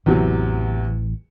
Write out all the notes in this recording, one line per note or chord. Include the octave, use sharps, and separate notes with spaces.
A1 E2 C3 E3 F#3